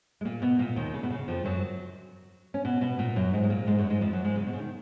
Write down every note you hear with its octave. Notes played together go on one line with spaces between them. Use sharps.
G#3
A#2 A#3
B2 B3
A#2 A#3
D#2 D#3
C#3
B2
C#3
F2 F3
F#2 F#3
C#4
B2 B3
B2 B3
A#2 A#3
F#2 F#3
G#2 G#3
G#3
A#2 A#3
G#2 G#3
F#2 F#3
G#2 G#3
F2 F3
F#2 F#3
G#2 G#3
C#3
B2
C#3
D#3